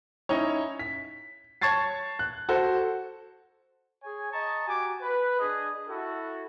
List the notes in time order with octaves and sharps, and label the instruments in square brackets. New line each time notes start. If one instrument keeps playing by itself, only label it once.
[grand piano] C#4 D#4 E4 C#5
B6
C#5 A5 C#6 G#6 A6 C7
F#6
F#4 A4 C5
[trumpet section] G#4 C#5 G#5
D#5 A5 A#5 C#6
F#4 G4 G#5 D6
B4
D4 G#4 D#5
E4 F#4 A4